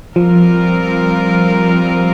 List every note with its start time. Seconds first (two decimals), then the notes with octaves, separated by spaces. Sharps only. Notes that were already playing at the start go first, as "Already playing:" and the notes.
0.16 F3 G3 C4 F4 A#4